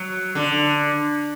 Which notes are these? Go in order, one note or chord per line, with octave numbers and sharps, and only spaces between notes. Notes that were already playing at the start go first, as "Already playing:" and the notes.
Already playing: F#3
D3